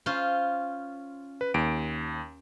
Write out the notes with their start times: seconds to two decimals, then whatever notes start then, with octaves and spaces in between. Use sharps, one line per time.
0.06 C#4 F4 C5
1.41 B4
1.54 D#2 D7